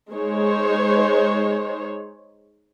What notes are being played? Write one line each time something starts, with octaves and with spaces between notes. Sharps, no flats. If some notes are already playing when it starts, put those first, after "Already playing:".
G#3 D#4 C5 C#5